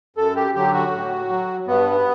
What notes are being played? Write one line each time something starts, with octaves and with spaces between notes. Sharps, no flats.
F#2 A4
G4
D3 F#3 G4
F#4
A2
F#3
G2 B3